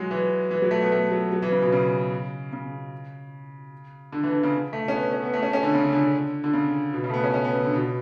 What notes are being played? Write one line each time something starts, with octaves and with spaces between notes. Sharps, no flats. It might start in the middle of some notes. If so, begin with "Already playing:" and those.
Already playing: F#3 G#3
E3
E3
F#3
A3
B3
A3
F#3
F#3
E3
C#3
B2
C#3
C#3
D3
E3
D3
C#3
A3
C#4
B3
C#4
B3
A3
C#4
C#4
D3
C#3
C#3
D3
D3
D3
C#3
B2
C#3
A3
B3
C#4
C#4
B3
C#3
D3
B2